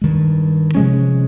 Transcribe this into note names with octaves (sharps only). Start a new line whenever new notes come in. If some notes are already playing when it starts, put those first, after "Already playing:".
G2 D#3 G#3
C3 F3 G#3 C#4